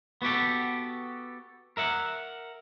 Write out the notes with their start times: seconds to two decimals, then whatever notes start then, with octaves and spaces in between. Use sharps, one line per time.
0.22 B3 F#4 G4 A4
1.77 A#4 E5 F#5